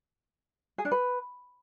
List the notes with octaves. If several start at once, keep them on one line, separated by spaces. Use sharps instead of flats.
G#4
D4
B4